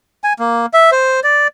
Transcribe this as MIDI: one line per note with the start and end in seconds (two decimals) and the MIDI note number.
0.24 0.33 80
0.39 0.66 58
0.73 0.90 76
0.92 1.20 72
1.24 1.48 74